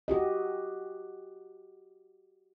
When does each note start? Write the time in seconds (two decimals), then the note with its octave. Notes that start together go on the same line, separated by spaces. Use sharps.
0.08 F#4 G4 D#5